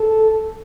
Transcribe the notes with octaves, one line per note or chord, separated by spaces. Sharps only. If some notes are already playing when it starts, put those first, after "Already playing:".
Already playing: A4